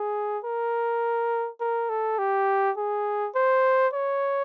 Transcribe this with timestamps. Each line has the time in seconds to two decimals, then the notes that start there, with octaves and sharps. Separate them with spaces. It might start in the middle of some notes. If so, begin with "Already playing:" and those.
Already playing: G#4
0.44 A#4
1.60 A#4
1.90 A4
2.19 G4
2.77 G#4
3.35 C5
3.94 C#5